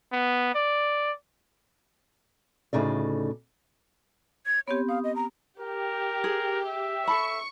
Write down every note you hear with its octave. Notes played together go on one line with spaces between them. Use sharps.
B3
D5
D2 A2 C#3 D#4 D5
G#6
B3 C4 G4 C#5
F5 D#6
D#5
A#5
G4 A#4
G#4
E5
A4 A5 B5 C#6